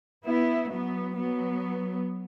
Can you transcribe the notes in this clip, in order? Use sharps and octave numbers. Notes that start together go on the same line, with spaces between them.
B3 E4
F#3 B3
F#3 B3